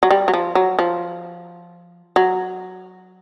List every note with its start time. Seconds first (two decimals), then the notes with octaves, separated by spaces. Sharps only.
0.03 F#3
0.11 G3
0.28 F#3
0.34 F3
0.55 F#3
0.79 F3
2.16 F#3